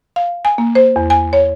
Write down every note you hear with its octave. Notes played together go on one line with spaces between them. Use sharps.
F5
G#5
A#3
C5
E2
G#5
C#5